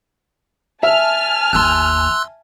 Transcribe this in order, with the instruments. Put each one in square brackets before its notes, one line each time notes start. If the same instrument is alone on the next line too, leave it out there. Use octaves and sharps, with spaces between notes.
[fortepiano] E5 [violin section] G#5 A5 F6
[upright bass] G1 D#2 [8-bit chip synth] C6 E6 F#6